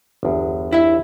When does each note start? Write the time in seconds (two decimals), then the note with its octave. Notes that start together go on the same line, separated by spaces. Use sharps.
0.23 G1 E2
0.72 E4 E5